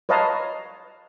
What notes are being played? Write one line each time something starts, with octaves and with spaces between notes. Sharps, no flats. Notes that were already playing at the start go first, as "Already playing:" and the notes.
B4 C#5 D#5 F5 A5 A#5